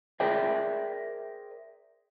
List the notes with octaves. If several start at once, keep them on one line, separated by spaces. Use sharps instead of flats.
G#4 A#4 C5 D5 E5 G5